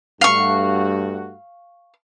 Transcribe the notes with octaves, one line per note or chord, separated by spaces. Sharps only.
G2 A3 F#4 F5 C#6